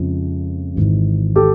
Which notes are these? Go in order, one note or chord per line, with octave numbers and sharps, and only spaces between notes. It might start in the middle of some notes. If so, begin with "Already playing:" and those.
Already playing: F2 C#3 F3 G#3
G#1 G#2 E3
G4 A4